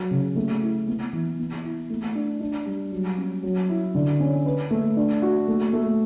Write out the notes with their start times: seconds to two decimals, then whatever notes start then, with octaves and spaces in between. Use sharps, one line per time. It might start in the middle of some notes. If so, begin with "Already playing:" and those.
Already playing: F#3
0.11 C#3
0.36 A3
0.62 E4
0.87 B3
1.13 E3
1.39 B3
1.64 E4
1.90 A3
2.15 D4
2.41 D4
2.66 G3
2.92 F#3
3.18 C#4
3.43 F#3
3.69 E4
3.94 D3
4.20 C#4
4.46 B4
4.71 A3
4.97 D4
5.22 F#4
5.48 A3
5.73 A3